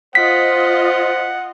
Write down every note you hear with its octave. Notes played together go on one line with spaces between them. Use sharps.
F4 C5 D#5 F#5 B6